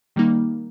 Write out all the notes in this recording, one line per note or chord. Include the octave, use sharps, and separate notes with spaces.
D#3 G3 A#3 D#4